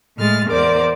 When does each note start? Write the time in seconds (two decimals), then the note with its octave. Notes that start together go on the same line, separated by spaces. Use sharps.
0.18 A2 G#3 F6 A6
0.51 E2 A#4 C5 D5 D6